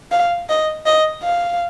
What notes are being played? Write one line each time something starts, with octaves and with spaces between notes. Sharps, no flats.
F5
D#5
D#5
F5